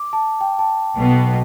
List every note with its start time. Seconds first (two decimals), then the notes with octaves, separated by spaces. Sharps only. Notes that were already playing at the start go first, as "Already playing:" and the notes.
Already playing: D6
0.13 A5
0.41 G5
0.59 A5
0.96 B1 B2 B3